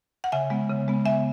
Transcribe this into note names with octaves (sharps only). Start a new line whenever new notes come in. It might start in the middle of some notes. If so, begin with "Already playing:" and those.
F#5
C#3 E5 G#5
G#3 B3
C#3
G#3 B3
C#3 E5 G#5